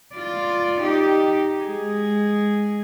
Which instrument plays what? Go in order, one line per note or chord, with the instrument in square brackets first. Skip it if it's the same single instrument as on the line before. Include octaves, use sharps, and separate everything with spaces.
[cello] F4 D5
D#4 G4
G#3 G#4